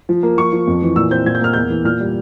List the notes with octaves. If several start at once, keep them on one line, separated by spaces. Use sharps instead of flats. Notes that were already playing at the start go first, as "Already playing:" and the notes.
F3
A#3
F3 C#6
F3
F2
E3
A#2 E6
C4 G6
A#2 G#6
G6
A#3 F6
E2 G6
E3
A#2 F6
G3